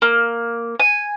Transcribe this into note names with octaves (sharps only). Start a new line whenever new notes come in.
A#3
G#5